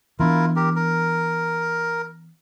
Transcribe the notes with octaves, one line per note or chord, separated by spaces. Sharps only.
E3 B3 D4 E4 F4 A#4
G4 A#4
A#4